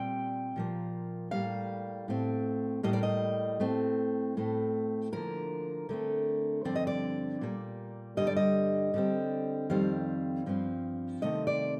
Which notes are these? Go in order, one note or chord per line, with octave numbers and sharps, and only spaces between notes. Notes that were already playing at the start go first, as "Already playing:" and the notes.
Already playing: A#2 G3 C4 G5
A#2 F3 A#3
A2 G3 A#3 F5
A2 A3 C4
A2 G3 A#3 D#5
D5
D#5
A2 A3 C4
A2 A3 C4
D3 F3 A#3 A#4
D3 A3 C4
G2 D3 F3 C4 D5
D#5
D5
A#2 G3 A#3
G2 D3 G3 D#5
D5
D#5
D3 G3 C4
F2 D#3 G3 C4 F5
G2 F3 C4
C3 D#3 A3 C4 D#5
D5